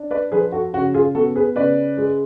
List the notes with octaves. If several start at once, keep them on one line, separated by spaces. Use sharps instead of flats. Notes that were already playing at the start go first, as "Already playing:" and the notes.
Already playing: D4
B4 D5
F3 G#4 B4
F#4 A4
C#3 F#4
F4 G#4
B3 F#4 A4
G#4 B4
C#3 B4 D5
G#3